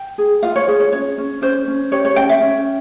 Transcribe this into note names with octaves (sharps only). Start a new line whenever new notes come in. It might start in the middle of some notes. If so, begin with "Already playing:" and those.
Already playing: G5
G#4
F4 F5
C#5
G#4 C#5
C#5
C#4 C#5
C#4
C#4 C5
C#4
G4 C#5
C#5
C#4 G5
E5
C#4